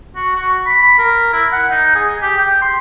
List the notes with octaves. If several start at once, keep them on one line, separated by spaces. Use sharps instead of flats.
F#4
F#4
B5
B5
A#4
E4
F#5
D#4
G#4
G4
G5
C6